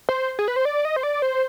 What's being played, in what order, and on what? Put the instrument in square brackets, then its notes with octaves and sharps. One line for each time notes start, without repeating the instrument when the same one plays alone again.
[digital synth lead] C5
G#4
B4
C5
D5
D#5
C5
D5
C5